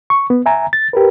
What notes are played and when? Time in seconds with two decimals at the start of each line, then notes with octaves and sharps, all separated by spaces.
0.10 C#6
0.30 B3
0.46 E5 G#5 A#5
0.73 A6
0.93 G4 A#4 B4